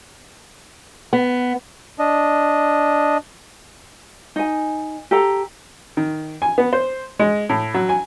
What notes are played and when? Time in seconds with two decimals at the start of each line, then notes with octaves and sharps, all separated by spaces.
1.13 B3
1.99 D4 D#5
4.36 D#4 G#5
5.11 G4 A4 A#5
5.97 D#3
6.42 G#5
6.58 B3
6.73 C5
7.19 G#3
7.49 A2
7.74 F#3
7.89 G#5